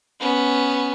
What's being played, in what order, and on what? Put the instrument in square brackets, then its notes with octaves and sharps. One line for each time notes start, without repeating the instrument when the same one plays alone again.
[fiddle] B3 C#4